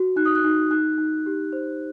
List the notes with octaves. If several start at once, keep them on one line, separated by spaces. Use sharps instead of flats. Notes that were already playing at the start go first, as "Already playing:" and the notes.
Already playing: F#4
D#4 F#6
D#6
F#6
D#4
D#4 F#6
D#4
G4
C5